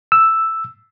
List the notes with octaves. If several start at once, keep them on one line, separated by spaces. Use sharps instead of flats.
E6